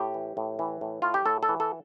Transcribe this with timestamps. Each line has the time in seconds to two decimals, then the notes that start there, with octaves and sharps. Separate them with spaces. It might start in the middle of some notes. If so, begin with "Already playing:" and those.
Already playing: A2 G4
0.14 E3
0.37 A2
0.59 E3
0.81 A2
1.02 A2 F4
1.14 G4
1.26 A2 A4
1.43 A4
1.49 E3
1.60 A4